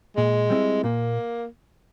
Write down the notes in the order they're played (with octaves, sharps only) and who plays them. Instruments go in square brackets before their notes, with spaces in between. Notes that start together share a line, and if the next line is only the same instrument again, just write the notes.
[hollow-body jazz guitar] A#2 [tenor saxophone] G#3
[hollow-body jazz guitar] G3 C4 E4
[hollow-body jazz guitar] A#2 [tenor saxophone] A#3